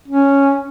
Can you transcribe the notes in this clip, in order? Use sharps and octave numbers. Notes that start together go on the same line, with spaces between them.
C#4